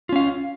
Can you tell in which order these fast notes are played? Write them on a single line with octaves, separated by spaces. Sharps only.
F4 C#4 F5